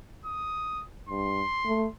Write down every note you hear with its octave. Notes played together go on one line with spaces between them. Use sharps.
D#6
G2 C6
A3